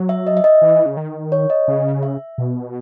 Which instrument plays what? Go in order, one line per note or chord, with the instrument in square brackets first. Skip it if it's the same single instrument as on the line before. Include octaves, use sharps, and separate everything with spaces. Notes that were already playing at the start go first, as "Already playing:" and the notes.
Already playing: [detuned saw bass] F#3
[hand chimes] E5
D#5
E5
D#5
[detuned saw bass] E3
C#3
D#3
[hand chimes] C#5
D#5
[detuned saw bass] C#3
[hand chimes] E5
[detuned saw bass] B2